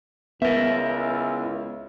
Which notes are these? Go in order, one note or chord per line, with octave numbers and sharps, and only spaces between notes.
C#2 B3 E4 A#4 E5